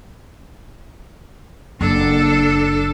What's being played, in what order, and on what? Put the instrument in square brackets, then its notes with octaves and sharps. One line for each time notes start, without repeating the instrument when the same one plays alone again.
[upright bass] F#1 [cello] D4 A4